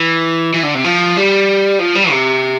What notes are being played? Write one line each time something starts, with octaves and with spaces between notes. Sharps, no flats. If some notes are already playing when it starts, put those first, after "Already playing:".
Already playing: E3
E3
D3
C3
F3
G3
F3
G3
C3